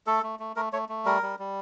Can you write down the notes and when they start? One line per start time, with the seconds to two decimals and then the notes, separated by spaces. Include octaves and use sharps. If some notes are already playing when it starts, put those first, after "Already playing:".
0.07 A3 A4
0.23 A3
0.39 A3
0.56 A3 A#4
0.73 A3 C#5
0.89 A3
1.05 G3 A#4
1.23 G3
1.39 G3